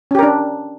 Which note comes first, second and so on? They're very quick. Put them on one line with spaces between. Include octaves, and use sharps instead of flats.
C#4 G4 A#4 D4